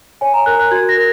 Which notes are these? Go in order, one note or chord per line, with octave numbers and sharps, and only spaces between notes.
C#5 G#5
A#5
A#4 F#6
F#6
F#4 G#6
A#6
A#4